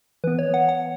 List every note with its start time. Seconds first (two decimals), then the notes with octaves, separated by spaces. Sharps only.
0.24 E3 B3 B4
0.39 C#5
0.54 F#5
0.69 F#5